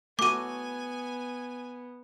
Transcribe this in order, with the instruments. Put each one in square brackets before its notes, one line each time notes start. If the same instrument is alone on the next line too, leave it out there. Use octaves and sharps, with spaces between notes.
[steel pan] A3 F#4 [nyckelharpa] B3 [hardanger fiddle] G#5 [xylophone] D6 D#7